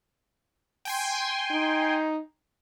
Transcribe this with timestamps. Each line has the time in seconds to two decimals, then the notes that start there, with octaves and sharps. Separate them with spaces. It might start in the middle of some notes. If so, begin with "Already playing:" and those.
0.85 G5 G#5 C6
1.51 D#4